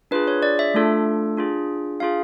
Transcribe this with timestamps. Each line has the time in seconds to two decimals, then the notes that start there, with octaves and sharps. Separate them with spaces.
0.11 D4 F4 G#4 B4
0.28 C#5
0.43 D5
0.59 E5
0.74 A3 D4 F4 A4
1.37 D4 F4 G#4
2.00 D4 F4 G#4 F5